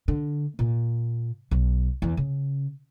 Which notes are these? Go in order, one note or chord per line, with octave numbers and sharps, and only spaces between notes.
D3
A#2
B1
E2
C#3